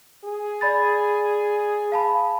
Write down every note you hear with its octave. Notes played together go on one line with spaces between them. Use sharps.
G#4
D5 B5 A6
F5 A5 B5